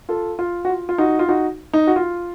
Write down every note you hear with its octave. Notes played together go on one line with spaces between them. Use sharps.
F4 A4
F4
F#4
F4
F4
D#4 F#4
F4
D#4 F#4
D#4
F#4
F4